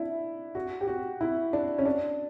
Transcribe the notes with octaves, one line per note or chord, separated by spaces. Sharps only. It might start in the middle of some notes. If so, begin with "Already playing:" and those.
Already playing: D4 E4
F#4
G4
F#4
E4
D4
C#4
D4